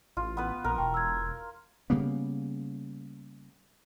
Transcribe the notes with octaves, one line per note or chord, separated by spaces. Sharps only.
A1 F4
B3 B4
A#1 A#4
E1 G5 A5 C#6
E6 G#6
C#3 G3 A#3 B3